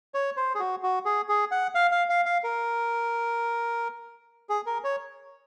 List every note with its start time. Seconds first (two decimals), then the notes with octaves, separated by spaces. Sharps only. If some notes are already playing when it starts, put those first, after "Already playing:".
0.14 C#5
0.37 C5
0.55 G#4
0.60 F#4
0.83 F#4
1.05 G#4
1.29 G#4
1.51 F#5
1.75 F5
1.92 F5
2.09 F5
2.26 F5
2.44 A#4
4.49 G#4
4.66 A#4
4.84 C#5